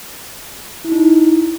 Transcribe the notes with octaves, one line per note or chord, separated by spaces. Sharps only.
E4
D#4
E4